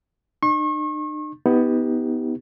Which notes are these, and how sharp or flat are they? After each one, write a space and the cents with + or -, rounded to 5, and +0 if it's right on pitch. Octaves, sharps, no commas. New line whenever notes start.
D#4 -45 C#6 -40
B3 +5 D#4 +35 G4 +0